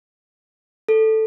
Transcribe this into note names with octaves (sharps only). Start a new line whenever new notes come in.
A4